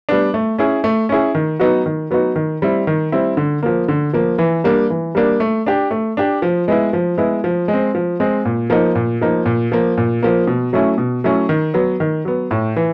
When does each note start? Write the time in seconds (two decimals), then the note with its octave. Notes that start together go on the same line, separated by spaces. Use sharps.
0.09 G3 B3 D4
0.34 A3
0.58 C#4 E4 G#4
0.84 A3
1.09 C#4 E4 G#4
1.35 D#3
1.60 F#3 B3 D#4 F#4
1.86 D#3
2.11 F#3 B3 D#4 F#4
2.36 D#3
2.62 G3 C4 E4
2.87 D#3
3.12 G3 C4 E4
3.37 D3
3.63 F3 A#3
3.88 D3
4.13 F3 A#3
4.38 E3
4.64 G3 A#3 D4
4.90 E3
5.15 G3 A#3 D4
5.40 A3
5.66 D4 G4
5.91 A3
6.17 D4 G4
6.42 F3
6.68 G#3 B3 E4
6.93 F3
7.18 G#3 B3 E4
7.44 F3
7.68 G#3
7.73 C4
7.95 F3
8.20 G#3 C4
8.45 A#2
8.70 F3 A#3 D#4
8.95 A#2
9.21 F3 A#3 D#4
9.46 A#2
9.72 F3 A#3
9.98 A#2
10.23 F3 A#3
10.47 B2
10.73 F#3 A3 C#4 E4
10.98 B2
11.24 F#3 A3 C#4 E4
11.49 D#3
11.74 F#3 B3
12.00 D#3
12.25 F#3 B3
12.51 A2
12.76 E3